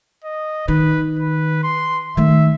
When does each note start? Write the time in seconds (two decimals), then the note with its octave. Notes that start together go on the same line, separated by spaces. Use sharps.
0.24 D#5
0.68 D#3 B4
1.20 B4
1.63 C6
2.17 D#3 A3 E5